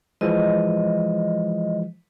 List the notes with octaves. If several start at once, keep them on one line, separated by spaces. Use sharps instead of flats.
E3 F3 G#3 D#5